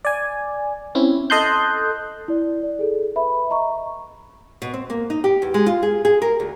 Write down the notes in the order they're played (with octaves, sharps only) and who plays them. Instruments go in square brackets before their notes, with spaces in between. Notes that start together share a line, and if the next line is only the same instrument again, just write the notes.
[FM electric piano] D5 G#5
C4 C#4 E4
A4 D#5 A5 C6 F#6 G6
[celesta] E4 D5
D5
G#4 A4
B4 E5 B5
D#5 A#5 C#6
[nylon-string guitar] B2
C4
A#3
D#4
G4
E2
G#3
F4
G#4
G#4
A#4
D2